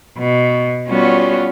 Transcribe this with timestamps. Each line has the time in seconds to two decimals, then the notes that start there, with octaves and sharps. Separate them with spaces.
0.17 B2
0.87 G3 B3 C#4 F4 F#4